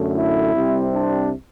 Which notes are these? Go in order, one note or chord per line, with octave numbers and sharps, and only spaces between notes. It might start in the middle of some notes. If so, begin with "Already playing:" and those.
Already playing: F#2 D3 A3
E4
C2 C3 G3 C4
D4